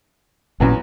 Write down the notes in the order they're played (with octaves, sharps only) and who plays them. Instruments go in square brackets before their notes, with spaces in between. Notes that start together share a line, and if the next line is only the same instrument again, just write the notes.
[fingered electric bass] A1 A#2 C#4 [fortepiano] E2 F#3 B3